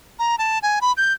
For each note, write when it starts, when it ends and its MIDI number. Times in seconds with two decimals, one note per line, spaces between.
0.19 0.35 82
0.38 0.59 81
0.62 0.79 80
0.81 0.92 83
0.97 1.13 91